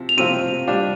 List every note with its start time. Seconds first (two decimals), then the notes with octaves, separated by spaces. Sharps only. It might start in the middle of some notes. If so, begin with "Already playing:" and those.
Already playing: C3 F3
0.09 F7
0.17 C3 F3 C4 F4 D#7
0.67 G3 D4 F4